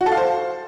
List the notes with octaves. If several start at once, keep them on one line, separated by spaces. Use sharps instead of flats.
F#4
A4
F5
C5